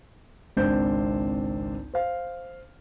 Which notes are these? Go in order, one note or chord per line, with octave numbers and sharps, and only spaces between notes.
G#1 C#2 C4 D4 C5 G6
C5 F5